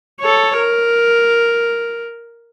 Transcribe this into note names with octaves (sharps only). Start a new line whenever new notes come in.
A4 C#5
A#4